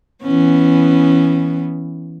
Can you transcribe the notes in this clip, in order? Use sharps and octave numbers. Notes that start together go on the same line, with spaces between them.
E3 B3 C#4